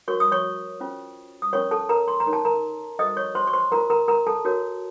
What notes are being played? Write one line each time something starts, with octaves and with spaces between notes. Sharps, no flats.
F#4 A#4 C#5 C#6
D#6
C#5 C#6
C#4 F4 C5
D#6
C#4 F4 A#4 C#5 C#6
A4 A5
A#4 A#5
C6
A#5
D#4 A#4 C#5
A5
A#4 A#5
F#4 A4 C5 D#5 D#6
C#5 C#6
C5 C6
C#6
C5 C6
F4 A#4 C5 A#5
A#4 A#5
A#4 A#5
A4 A5
F#4 A#4 C#5